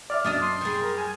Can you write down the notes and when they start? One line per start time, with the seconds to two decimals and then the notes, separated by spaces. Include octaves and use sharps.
0.10 D5 E5 F6
0.25 F#2 D4 D5 D#5 D#6
0.41 C6
0.61 G3 G#4
0.81 A#4
0.96 G#5